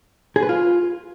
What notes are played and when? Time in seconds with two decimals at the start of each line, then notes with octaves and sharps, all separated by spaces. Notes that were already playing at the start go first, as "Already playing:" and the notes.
0.36 G#4
0.42 B4
0.49 F4